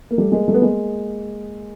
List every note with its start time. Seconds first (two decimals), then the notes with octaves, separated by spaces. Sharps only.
0.11 A#3
0.18 G3 A3
0.32 G#3 A#3
0.48 G3 A3
0.54 B3
0.61 G#3 A#3